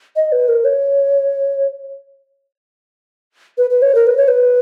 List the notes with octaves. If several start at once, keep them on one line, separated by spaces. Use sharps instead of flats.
D#5
B4
A#4
C#5
B4
B4
C#5
A#4
B4
C#5
B4